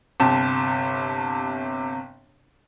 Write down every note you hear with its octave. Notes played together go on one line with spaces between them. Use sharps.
G1 C3 G4 A5